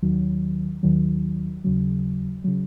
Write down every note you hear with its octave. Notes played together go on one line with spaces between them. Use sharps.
D#2 D#3 F#3
D#2 D#3 F#3
D#2 C#3 F#3
C#3 F#3